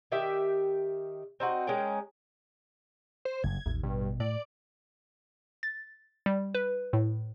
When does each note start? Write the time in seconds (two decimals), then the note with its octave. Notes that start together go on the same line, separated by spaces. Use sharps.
0.12 D#3 G4 E5 G5
1.40 C4 D#4 F#4
1.67 G#3 C#4 A#4 G5
3.25 C5
3.44 F#1 G2 G#6
3.66 A1 D#2
3.83 G2 B2
4.20 A2 D5
5.63 A6
6.26 G3
6.55 B4
6.93 A2